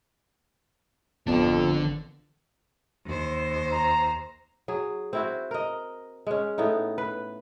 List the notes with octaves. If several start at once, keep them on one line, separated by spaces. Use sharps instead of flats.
G#1 F2 D3 B3 D4 A5
D#2 C5
A#5
F#3 G#4
C4 E4 F#4
A#4 D#5
G#3 C#4
A2 B3 D#4
B4